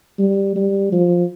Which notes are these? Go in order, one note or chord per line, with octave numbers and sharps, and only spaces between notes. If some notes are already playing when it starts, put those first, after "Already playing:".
G3
G3
F3